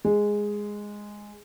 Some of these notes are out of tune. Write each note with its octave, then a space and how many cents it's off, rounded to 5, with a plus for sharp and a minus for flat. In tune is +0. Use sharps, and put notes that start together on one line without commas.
G#3 -5